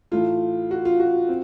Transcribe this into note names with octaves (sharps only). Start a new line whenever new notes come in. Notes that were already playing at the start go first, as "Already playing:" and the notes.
A2 E3 A3 F4
F#4
F4
F#4
C4